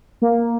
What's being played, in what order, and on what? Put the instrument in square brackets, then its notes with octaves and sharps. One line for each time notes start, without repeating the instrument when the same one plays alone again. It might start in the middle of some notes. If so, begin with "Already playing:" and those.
[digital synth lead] A#3